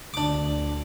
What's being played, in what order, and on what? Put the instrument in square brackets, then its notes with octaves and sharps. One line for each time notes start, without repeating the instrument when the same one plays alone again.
[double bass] D2 [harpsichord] D4 D6